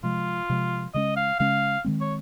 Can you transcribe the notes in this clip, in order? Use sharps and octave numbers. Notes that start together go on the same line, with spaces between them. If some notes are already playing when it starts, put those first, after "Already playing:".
C3 F3 G#3 F4
C3 F3 G#3
C#3 G#3 C#4 D#5
F5
C#3 G#3 C#4 F5
D#3 G#3 C4
C#5